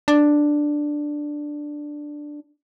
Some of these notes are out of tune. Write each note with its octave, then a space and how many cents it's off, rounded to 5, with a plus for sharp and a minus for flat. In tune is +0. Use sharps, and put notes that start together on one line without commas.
D4 +5